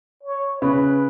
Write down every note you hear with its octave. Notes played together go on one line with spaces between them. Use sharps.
C#5
C#3 B4